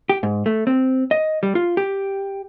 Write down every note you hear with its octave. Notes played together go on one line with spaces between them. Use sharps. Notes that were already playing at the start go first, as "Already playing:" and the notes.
G4
G#2
A3
C4
D#5
G3
F4
G4